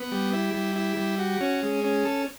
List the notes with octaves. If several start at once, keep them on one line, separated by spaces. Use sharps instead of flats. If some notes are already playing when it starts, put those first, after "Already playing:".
Already playing: B3
G3
E4
G3
E4
G3
F#4
C#4
G#3
C#4
A4